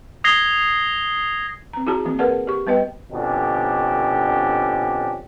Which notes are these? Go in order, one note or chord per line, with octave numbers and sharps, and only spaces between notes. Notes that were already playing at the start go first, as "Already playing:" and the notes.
D#6 G#6 A#6 C7 G7
C4 A#5
E4 F#4 G#4 A5 A#5
E3 A#3 C4
G#4 A#4 B4 D5 F#5 A5
G4 C#6
G3 B3 B4 D#5 G5
F2 B2 D3 C#4 D4 G4